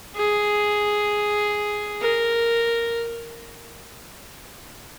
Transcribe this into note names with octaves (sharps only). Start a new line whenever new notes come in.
G#4
A#4